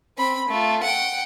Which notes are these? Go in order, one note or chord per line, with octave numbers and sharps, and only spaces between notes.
C4 B5
A3 F4
F#5 G5